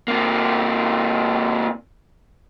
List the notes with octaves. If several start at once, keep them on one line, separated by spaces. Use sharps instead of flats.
C3 A#3